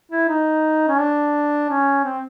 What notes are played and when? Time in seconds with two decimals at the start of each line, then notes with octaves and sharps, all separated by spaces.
0.11 E4
0.29 D#4
0.88 C#4
0.99 D4
1.69 C#4
2.04 C4